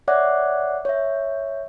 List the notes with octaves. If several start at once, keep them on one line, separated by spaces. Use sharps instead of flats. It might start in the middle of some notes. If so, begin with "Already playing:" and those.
C#5 D5 E5 F#5 D6 F#6
C#5 E5